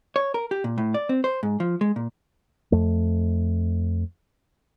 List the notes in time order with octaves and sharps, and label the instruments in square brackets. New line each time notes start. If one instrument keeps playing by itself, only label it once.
[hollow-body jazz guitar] C#5
A#4
G4
A#2
A2
D5
C4
C5
G#2
F3
G#3
A#2
[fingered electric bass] F2 A3